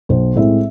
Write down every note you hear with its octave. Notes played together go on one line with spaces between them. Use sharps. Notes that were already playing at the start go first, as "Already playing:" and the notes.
B1 C5
A2 G#3 C4 E5